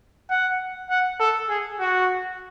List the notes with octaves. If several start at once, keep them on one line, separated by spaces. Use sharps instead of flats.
F#5
F#5
A4
G#4
F#4